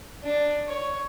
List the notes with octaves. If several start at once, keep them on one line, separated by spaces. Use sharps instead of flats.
D4
C#5